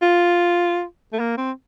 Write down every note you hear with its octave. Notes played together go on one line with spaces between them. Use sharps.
F4
A3
A#3
C4